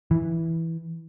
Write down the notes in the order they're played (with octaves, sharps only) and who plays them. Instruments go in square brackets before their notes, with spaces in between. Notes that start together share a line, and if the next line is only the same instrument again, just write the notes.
[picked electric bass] E3